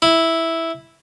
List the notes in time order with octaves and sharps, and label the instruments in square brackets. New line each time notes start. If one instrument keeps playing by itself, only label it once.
[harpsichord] E4